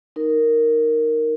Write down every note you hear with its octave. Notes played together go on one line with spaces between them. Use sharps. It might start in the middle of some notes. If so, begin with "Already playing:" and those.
D#4 A#4